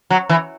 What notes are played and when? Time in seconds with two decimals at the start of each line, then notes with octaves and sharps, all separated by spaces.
0.10 F#3
0.29 E3